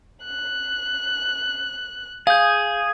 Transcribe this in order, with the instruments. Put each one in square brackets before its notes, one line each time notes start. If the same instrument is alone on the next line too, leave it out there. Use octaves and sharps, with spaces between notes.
[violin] F#6
[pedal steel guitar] G#4 [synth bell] F5 G6